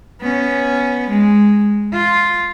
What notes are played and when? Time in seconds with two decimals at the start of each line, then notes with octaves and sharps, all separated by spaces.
0.21 B3 C#4
1.10 G#3
1.93 F4